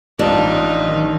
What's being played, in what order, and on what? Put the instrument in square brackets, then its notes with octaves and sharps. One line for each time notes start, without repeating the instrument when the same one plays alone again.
[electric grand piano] A1 F3 [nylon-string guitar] D4 [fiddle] D#4 F4
[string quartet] D#3